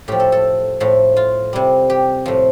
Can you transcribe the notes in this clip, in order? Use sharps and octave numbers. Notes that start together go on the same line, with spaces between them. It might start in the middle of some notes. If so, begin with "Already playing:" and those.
A2 F3 G4
A4
A4
A2 F3
F4
C3 G3
G4
A2 F3